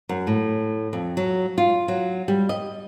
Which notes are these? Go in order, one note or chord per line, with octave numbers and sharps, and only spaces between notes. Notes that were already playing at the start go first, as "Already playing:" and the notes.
F#2
A2
F2
F#3
F4
F#3
G3
D#5